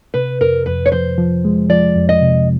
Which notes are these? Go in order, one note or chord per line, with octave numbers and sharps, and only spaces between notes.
C3 B4
F2 A#4
F2 B4
C#5
F3 C5
F3
G#3
F3 D5
F2
D#5
C3